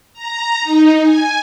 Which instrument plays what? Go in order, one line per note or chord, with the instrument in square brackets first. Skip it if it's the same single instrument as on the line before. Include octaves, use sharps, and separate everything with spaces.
[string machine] A#5
D#4
G#5